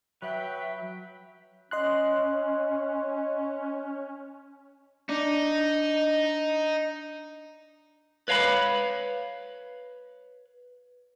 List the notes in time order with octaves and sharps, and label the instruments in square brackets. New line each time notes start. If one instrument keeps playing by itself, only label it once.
[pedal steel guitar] F#3 [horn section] B4 G5 [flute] E5
[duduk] C#4 [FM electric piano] D#5 C6 F#6
[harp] D4 [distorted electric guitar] D#4
[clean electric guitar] B4 C#5 F5 G#5 B5